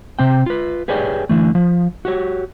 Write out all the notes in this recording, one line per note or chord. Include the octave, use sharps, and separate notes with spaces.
C3 C4 G5
F4 B4
G4 G#4 B4 C#5 D5 G5
D3 E3 A3
F3
F#4 G4 C#5